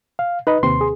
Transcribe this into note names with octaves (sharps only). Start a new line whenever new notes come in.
F5
D#4 B4 D#5 B5
D#2 C3 C4 C6
G#4